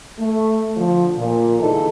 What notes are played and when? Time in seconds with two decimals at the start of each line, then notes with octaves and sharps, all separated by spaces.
0.20 A3
0.77 D3 F3
1.16 A#2
1.60 D3 E3 G#3 D#4 A4